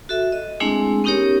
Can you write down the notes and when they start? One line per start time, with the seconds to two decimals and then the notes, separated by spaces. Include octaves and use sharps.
0.09 F#4 A4 E5
0.32 D#5
0.60 G#3 A3 C4 D4 E4 G#4
1.04 B3 C#4 D#4 G4 A#4 C#5